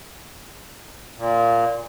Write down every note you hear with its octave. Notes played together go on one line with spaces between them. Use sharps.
A#2